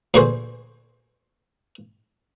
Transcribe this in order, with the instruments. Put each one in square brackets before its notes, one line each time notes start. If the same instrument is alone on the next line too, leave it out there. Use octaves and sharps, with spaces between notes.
[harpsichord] D2 A#2 E3 F#4 G#4 C5